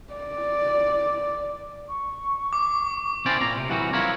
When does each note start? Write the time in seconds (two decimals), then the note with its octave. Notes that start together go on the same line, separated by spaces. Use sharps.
0.13 D5
1.88 C#6
2.53 D6
3.26 C4 C#4 E4 A#4 C5 D5
3.41 A#2 A#5
3.57 C3
3.69 C2 C3 E3 F#3 G3 F#4
3.93 E4 F4 A#4 C#5